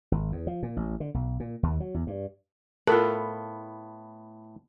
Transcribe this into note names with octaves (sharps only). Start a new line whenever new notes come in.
G#1
E2
F3
A#2
A1
D3
B1
A#2
D#2
F#3
E2
G2
A2 B3 F4 A4 A#4 B5